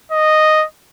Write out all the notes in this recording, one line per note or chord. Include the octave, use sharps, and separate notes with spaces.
D#5